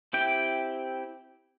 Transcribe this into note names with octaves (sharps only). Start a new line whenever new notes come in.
C4 E4 G4 G5